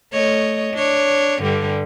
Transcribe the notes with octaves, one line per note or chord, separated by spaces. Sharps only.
A3 C#5 D#5
D4 C#5
G2 D3 G3